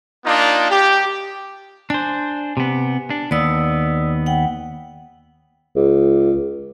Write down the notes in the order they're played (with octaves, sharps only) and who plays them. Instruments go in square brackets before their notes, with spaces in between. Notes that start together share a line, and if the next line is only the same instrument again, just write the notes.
[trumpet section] A#3 D4 D#4 F4
G4
[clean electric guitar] D4 C5 [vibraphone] G#5
[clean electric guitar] C3 B3
D4
[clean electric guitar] D#2 B3 [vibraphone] D5 D#6 E6
[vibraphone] F#5 G5
[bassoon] C#2